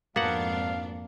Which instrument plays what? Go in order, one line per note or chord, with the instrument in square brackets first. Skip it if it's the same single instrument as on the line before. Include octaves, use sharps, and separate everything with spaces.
[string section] F2 G#2 D4 [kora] A#3 [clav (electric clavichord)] B3 F#4 F#5 [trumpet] F5